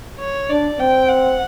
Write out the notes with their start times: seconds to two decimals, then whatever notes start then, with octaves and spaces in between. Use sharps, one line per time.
0.19 C#5
0.49 D4 D5
0.79 C4 G5
1.09 F#5